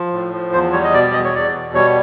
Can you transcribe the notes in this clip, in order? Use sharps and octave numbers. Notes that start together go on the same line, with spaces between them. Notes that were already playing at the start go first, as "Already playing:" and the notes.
Already playing: F3
A2
F3
E2 C5
G3 C#5
D#5
B2 D5
D5
E2 D#5
C#5
E2 D5
B2
G3 C#5